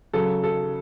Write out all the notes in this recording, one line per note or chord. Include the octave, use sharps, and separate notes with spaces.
C#3 F#3 A4
A4